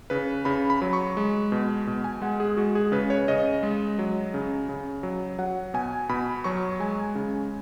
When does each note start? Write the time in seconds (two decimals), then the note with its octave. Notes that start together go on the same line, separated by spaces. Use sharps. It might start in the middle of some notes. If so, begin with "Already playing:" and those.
0.10 C#3 B4
0.45 C#3 B5
0.70 B5
0.82 F#3
0.93 C#6
1.17 G#3
1.52 B2
1.87 B2
2.04 G#5
2.22 G#3 F#5
2.40 G#4
2.57 G#3 F#4
2.75 G#4
2.92 C#3 B4
3.10 C#5
3.28 C#3 D#5
3.63 G#3
3.99 F#3
4.34 C#3
4.69 C#3
5.03 F#3
5.39 F#3 F#5
5.74 B2 G#5
6.09 B2 B5
6.44 F#3 C#6
6.80 G#3 G#5
7.15 C#3